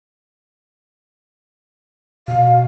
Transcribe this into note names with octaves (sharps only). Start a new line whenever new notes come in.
B2 F5